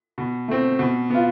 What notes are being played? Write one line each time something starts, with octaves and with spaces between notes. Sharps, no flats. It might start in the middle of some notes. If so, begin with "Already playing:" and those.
B2
A3 C4
B2
B3 F4